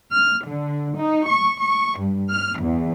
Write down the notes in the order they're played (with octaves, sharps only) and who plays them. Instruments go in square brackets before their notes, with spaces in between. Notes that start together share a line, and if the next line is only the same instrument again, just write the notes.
[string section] F6
D3
D#4
C#6
C#6
G2
F6
E2